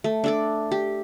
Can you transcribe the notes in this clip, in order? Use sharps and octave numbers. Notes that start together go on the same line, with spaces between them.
A3
D4 A4 D5
G4